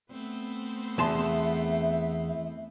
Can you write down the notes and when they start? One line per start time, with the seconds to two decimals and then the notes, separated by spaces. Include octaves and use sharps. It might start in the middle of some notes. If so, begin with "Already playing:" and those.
0.11 A3 B3 C4
0.98 E2 E5 A5 C6